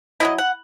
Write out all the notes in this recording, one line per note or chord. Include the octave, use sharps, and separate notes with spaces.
F#3 A#3 E4 D#5
F#5